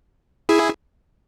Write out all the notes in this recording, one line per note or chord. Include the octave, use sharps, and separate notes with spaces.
E4 G#4